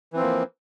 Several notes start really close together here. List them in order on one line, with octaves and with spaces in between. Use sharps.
E3 C4 F3 A#3